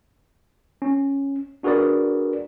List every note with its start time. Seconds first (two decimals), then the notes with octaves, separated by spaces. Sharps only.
0.82 C#4
1.63 D4 F#4 G#4 A#4 B4 D5